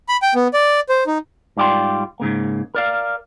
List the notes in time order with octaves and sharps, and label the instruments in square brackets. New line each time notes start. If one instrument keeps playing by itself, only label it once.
[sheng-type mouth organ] B5
G5
B3
D5
C5
D#4
[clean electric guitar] G#2 G3 F4 D5 G5 C6
G#2 C#3 A#3
A#4 D5 F5